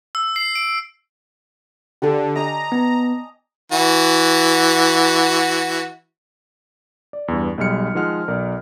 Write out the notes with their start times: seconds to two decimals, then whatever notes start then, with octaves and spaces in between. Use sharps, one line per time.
0.15 E6
0.36 C7
0.55 D7
2.02 D3 G4 A4
2.36 D#5 G#5 A#5
2.72 B3
3.72 E3 F#4
7.13 D5
7.28 E2 G2
7.58 B1 G3 G#3 F6 C#7
7.95 D#3 F3 G#3 F#5 F6
8.28 B1 A#4 D5